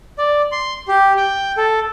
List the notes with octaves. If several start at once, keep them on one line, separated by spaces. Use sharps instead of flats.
D5
C6
G4
G5
A4